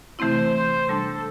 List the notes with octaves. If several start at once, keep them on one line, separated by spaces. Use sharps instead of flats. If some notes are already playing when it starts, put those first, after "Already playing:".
C3 E3 A3 C4 E4 C5
C5
C3 G3 D4 A4